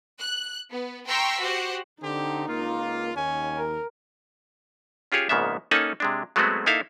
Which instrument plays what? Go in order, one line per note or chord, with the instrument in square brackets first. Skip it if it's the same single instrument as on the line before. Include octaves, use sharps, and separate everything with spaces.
[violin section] F#6
B3
G5 A#5 C6 C#6 E6 B6
F#4 G4 C5 F#5
[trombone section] D3 [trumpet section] C4 G4 [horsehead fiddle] D#4
[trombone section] C#2 A#3 [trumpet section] F4
[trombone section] D#2 [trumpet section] C#4 G#5
[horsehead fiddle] A#4
[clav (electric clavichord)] C#4 F4 G4 G#4 C#5
A#1 G#2 C#3 A#3 B3 E5
A#3 C#4 D#4 A4 F#5 G#5
C3 G#3 D4
F#3 G#3 A3 B3 C4 F#4
A#3 D#4 E4 A4 E5 F5